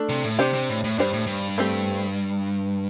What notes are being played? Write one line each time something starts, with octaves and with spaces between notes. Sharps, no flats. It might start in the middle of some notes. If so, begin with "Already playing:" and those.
Already playing: A3 D4 A4
C3
A2
C3 D4 G4 C5
C3
A2
A2
G2 D4 G4 C5
A2
G2
A3 C4 G4